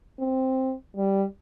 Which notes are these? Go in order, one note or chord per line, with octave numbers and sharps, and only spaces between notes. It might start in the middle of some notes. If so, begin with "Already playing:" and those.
C4
G3